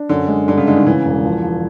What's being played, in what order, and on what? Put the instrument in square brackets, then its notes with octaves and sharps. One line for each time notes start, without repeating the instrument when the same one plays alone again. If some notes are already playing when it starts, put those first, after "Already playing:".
Already playing: [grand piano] D4
[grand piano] F#2 [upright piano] D3
[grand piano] G#3
[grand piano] G2 [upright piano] D3
[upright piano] C#3
[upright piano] D3 [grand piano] G#3
[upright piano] D#3
[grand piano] C#3 [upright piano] E3
[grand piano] E1
F3
F3